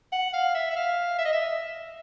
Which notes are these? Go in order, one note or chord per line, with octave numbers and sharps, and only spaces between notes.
F#5
F5
E5
E5
F5
E5
D#5
E5